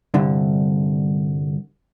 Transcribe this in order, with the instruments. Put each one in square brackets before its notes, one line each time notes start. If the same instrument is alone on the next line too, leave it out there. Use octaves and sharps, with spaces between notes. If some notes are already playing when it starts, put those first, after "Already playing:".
[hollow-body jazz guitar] C2 G2 D3